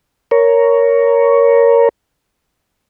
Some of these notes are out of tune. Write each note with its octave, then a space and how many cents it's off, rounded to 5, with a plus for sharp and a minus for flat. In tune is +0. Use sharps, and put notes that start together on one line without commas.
A#4 +0 C#5 +10